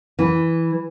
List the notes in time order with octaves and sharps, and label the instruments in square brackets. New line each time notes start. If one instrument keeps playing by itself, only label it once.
[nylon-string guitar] E3